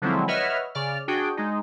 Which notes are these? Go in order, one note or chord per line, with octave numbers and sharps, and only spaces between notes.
D3 F3 F#3 G#3 C4 E4
B4 C#5 D#5 E5 F#5 F6
C#3 D5 F6
D4 F#4 G#4 G5
G#3 D#4